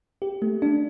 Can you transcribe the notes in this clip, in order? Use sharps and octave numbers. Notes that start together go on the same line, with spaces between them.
G4
A3
D4